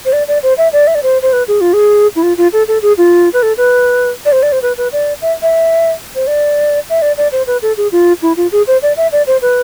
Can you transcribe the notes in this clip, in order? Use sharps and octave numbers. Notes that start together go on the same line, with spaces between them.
C5
D5
D5
C5
E5
D5
E5
D5
C5
C5
B4
G#4
F4
G#4
E4
F4
F4
A4
A4
G#4
F4
B4
A4
B4
D5
C5
D5
C5
B4
B4
D5
E5
E5
C5
D5
E5
D5
D5
C5
B4
A4
G#4
F4
E4
F4
G#4
C5
D5
E5
D5
C5
B4